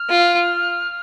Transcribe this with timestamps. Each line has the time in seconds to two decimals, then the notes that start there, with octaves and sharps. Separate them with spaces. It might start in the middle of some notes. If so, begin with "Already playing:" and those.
Already playing: F6
0.10 F4